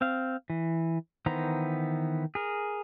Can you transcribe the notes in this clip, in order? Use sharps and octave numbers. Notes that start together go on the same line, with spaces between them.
C4 F5
E3
D#3 E3 B3 C5 A#5
G#4 A#4